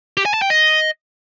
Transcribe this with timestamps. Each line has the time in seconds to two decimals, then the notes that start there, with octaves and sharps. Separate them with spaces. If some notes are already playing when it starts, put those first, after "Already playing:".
0.17 G4
0.26 G#5
0.34 A5
0.42 G5
0.50 D#5